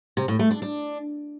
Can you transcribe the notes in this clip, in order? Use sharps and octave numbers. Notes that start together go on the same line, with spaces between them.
C3
A2
A3
D4
D4